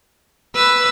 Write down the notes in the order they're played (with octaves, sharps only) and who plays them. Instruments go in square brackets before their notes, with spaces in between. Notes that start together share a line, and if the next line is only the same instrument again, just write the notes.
[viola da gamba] B4 [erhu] E6